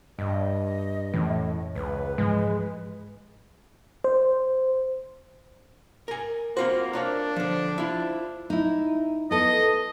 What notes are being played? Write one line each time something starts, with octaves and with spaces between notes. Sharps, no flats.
G2 D#5
F2 A2 E3 C#4
C#2 B4
G#2 E3 F3 G#3
C5
A#4 G#5
A#3 C4 F4 F#4 C5
D4 A#4 C#5 F5
D3 F3
E4 F4
D#4 E4
B3 A4 D#5